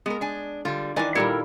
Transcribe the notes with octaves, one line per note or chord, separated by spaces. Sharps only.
G#3 B3 A#4
D4 G#5
D3 G3 F4
D#3 E3 D4 B4 D5 G#5
A#2 G3 A#3 E4 A4 A#4